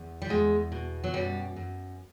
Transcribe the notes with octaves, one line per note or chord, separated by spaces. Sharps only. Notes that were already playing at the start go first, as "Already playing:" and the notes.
Already playing: E2
G3
E2 G#3
B2
F#3
F#2 G3
F#2